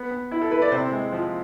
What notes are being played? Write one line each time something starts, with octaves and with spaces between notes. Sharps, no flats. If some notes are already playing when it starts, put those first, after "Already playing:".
Already playing: B3
B3
E4
A4
E4 B4
D5
C3 C5
G#3
F3